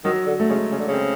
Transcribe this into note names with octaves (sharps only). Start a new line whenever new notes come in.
D#3 F#3
D3
A3
C#3 G#3
C#3
D3
C#3
C4